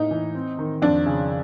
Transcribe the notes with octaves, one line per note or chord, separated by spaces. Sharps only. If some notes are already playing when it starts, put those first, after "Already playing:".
Already playing: A2 A#3 D#4
E3
C4
D#3
F2 D4
C#3